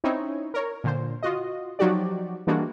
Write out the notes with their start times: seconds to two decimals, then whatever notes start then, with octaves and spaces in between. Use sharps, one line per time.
0.04 C4 C#4 D#4 E4 C#5
0.54 A#4 C#5
0.84 A#2 D3 C5
1.23 F4 F#4 D#5
1.79 F3 F#3 D#4 F#4 G4 D5
2.47 E3 G3 G#3 A#3 D4 F#4